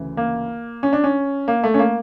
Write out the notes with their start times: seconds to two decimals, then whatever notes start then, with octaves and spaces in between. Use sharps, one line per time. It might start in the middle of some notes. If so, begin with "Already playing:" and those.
Already playing: D2 C#3 E3
0.17 A#3
0.83 C#4
0.93 D4
1.04 C#4
1.48 A#3
1.64 A3
1.74 C#4
1.79 A#3